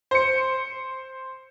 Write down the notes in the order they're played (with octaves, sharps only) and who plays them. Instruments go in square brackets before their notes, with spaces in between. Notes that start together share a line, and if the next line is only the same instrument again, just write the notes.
[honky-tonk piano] C5 C#7